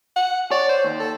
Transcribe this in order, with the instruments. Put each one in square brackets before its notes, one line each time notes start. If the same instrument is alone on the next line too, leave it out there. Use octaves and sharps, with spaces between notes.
[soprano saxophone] F#5
[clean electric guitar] C#5 [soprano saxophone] D5
[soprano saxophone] C5
[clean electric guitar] D#2
[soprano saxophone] A4